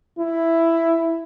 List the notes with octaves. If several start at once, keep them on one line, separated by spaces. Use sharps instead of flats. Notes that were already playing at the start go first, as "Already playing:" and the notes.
E4